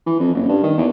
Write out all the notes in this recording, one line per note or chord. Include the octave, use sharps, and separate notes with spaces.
E3
F2
F#1
G2
D#3
E2